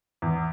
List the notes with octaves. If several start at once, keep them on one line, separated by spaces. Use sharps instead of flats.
E2